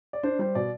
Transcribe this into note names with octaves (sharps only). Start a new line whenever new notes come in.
D5
D4 C5
G3 C5
B2 D5